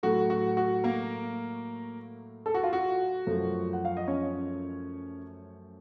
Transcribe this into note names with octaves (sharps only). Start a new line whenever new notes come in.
A2 F#3 A3 F#4
F#4
F#4
A#3 A#4
A4
F#4
F4
F#4
F#2 F3 A3
F#5
F5
D#5
C#4 C#5